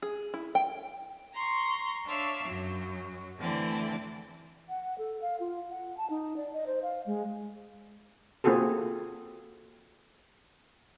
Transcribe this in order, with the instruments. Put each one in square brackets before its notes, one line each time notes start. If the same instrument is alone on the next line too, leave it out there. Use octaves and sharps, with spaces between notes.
[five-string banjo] G#4
E4
G5
[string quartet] A#5 C6 C#6
D4 C#5 E5 F5
F#2 F#3
D3 E3 A3 C4 D5
[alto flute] F#5
A4
F5
F4
F#5
A5
D#4
D5
D#5
C5
F5
G#3
[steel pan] A#3 C4 F4 F#4 G#4 A4